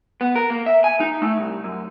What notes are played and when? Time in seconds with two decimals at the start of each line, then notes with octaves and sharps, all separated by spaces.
0.21 B3
0.36 A#4
0.50 A#3
0.66 E5
0.84 G#5
1.00 D#4
1.22 A3
1.37 C2
1.64 F#2